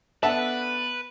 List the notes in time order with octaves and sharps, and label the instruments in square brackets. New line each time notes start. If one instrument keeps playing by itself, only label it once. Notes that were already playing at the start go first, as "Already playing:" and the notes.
[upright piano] B3 A5 [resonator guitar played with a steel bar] D4 A4 F#5 [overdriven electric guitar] B4 [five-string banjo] E5